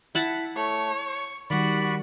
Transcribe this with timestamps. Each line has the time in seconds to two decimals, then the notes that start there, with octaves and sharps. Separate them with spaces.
0.15 E4 E5 F#5 A5
0.56 A3 C#5
1.06 C#6
1.50 D#3 G3 F#4 D5 B5